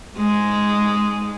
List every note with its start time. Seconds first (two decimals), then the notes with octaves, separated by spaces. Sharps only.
0.17 G#2 G#3